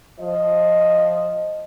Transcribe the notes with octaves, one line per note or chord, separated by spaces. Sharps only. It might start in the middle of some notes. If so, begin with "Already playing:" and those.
F3 D#5